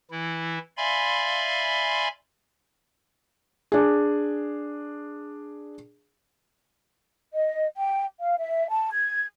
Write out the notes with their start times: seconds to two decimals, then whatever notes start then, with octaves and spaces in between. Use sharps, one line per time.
0.11 E3 E4
0.77 D5 E5 F5 G#5 B5 C6
3.72 D4 G#4
7.33 D#5
7.77 G5
8.20 F5
8.38 E5
8.69 A5
8.92 G#6